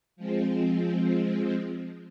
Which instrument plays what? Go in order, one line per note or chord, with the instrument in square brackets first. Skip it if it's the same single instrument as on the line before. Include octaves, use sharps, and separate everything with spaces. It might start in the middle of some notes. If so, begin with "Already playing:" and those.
[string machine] F3 G#3 C4